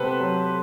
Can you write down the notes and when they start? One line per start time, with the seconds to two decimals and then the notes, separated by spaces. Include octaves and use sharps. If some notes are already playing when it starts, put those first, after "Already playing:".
Already playing: C3 B3 G4 A4 B4 C5
0.20 F#3